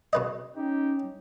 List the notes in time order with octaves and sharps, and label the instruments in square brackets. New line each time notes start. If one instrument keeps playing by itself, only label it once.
[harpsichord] B2 B4 D#5
[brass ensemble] C#4 D#4 G4